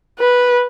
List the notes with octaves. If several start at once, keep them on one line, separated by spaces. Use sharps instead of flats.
B4